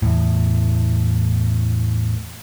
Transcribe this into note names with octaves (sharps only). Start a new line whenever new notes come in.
E2 A2